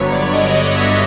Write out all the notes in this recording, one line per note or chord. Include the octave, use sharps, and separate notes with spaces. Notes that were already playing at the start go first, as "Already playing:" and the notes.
Already playing: G1 G2 D3 F#3 B3 C#5
D5
D#5
D#5
E5